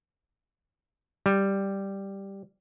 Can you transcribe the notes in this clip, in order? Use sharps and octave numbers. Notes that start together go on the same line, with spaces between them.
G3